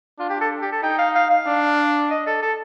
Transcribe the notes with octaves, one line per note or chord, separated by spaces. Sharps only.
D4 F4
G4
A4
G4
A4
D#4 G5
F5
F5
F5
D4
D#5
A4
A4